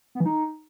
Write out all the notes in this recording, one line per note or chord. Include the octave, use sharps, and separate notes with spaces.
B3
E3
D#4